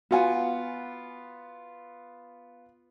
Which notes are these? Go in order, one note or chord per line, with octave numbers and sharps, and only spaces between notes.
B3 F4 F#4 F#5 G#5